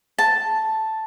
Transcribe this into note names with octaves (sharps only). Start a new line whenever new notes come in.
A5